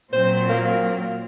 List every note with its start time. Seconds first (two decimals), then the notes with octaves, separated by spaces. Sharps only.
0.12 A#2 F#3 C4 C5
0.49 A#3